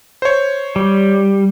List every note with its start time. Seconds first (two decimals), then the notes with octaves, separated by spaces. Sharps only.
0.22 C5 C#5
0.76 G3